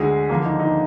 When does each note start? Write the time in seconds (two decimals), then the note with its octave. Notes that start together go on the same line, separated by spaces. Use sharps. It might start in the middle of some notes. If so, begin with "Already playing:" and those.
Already playing: D2 D3 G#3 G#4
0.29 D#2 D3 F3 A#3 D4
0.45 D#4
0.60 D#4